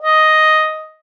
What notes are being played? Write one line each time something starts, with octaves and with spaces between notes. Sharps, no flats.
D#5